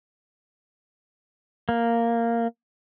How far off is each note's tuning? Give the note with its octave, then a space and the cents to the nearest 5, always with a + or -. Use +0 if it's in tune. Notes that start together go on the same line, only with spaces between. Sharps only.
A#3 -5